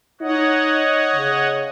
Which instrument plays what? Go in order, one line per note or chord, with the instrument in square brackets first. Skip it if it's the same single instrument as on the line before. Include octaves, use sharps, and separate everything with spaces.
[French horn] D#4 [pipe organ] C#5 D#5 F#5
[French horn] C#3